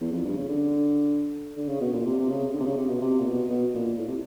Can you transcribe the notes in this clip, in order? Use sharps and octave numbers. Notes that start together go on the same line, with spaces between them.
E2
F2
G2
C#3
D3
D3
C#3
B2
A#2
C3
C3
C#3
D3
C3
C#3
C3
B2
C3
A#2
B2
B2
A#2
A2
C3